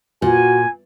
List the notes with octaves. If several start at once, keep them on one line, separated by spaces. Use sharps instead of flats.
A#2 F#4 G#5